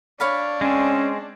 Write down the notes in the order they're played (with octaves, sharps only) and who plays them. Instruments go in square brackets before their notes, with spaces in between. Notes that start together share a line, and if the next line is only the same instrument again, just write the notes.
[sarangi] D4 [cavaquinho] C#5 F5 B5
[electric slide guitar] G#3 C4 [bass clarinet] C#4